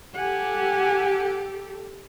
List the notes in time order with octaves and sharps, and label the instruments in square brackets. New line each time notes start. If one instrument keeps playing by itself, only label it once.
[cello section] G4 A4 [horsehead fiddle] F#5 G#5